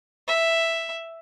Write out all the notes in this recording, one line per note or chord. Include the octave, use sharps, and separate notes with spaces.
E5